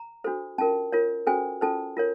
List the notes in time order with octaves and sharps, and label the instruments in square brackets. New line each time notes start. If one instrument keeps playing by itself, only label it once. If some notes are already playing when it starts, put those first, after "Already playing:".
Already playing: [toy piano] A#5
D4 F#4 A4 C5
C#4 F4 A#4 A5
F4 A#4 C#5
C#4 F#4 A4 C5 G#5
C#4 F4 A4 C5 A5
F4 A#4 C#5